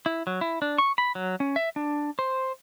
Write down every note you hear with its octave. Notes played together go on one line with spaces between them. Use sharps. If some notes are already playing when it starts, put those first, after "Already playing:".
E4
F#3
E4
D4
C#6
B5
F#3
C#4
E5
D4
C5